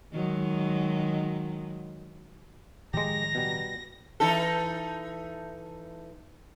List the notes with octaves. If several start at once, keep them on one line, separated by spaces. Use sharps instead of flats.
D#3 F#3 G#3
A2 D#3 F3 G#3 G4 A#5 A#6
B2 G3
E3 D#4 A4